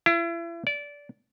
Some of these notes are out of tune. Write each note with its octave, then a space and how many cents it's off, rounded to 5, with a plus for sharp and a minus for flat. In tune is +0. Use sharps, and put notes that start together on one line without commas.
E4 +40
D5 -20